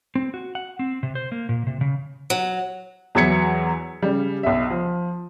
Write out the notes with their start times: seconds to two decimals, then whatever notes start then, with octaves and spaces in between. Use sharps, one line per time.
0.15 C4
0.34 F#4
0.55 F#5
0.79 C4
1.03 C3
1.15 C5
1.32 A#3
1.49 A#2
1.67 C3
1.81 C#3
2.30 F#3
3.15 E2 E3 F#3 G#6 B6 C#7
4.02 C#3 G3
4.43 B1 E5
4.70 F3